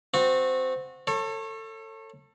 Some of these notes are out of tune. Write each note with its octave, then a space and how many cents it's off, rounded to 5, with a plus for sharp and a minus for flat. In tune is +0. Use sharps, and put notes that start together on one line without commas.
C4 -15 F#4 -25
A4 +25 C#5 -25